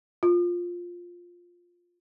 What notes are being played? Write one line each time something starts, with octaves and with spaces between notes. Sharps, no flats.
F4